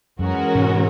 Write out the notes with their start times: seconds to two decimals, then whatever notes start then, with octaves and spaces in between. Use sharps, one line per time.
0.19 F#2 E3 G#3 C#4 F#4 A#4
0.55 G#2 B2